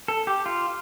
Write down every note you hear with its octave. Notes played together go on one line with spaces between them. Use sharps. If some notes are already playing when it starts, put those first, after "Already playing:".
A4
G4
F4